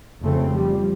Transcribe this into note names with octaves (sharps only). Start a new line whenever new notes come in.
F1 C#3 A3 C4
F3 G3